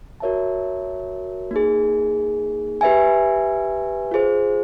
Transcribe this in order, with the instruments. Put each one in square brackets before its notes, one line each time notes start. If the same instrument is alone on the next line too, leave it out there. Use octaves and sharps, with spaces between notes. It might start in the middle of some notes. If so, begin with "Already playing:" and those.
[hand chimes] F#4 A#4 C#5 E5 A5
A#3 D#4 G#4
G4 B4 E5 G#5
F4 G#4 C5